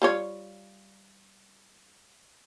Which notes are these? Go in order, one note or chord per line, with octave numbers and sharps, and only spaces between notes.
G3 F4 C#5